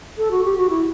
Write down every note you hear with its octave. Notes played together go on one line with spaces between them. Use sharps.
A4
F#4
G4
F#4
E4